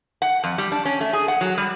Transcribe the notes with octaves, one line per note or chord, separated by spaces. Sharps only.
F#5
F2
G3
D4
C#4
A3
G#4
F#5
F#3
G3